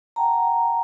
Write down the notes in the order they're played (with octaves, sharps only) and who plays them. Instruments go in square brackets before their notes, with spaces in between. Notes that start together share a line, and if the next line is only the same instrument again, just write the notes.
[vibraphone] F#5 G5 A5 A#5